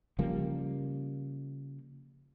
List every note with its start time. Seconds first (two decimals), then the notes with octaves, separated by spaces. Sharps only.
0.19 C#3 F3 G3 A#3